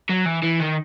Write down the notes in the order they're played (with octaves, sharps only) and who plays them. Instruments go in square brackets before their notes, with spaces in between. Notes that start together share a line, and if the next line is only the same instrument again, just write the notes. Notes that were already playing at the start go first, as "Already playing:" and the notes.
[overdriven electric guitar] F#3
E3
E3
D#3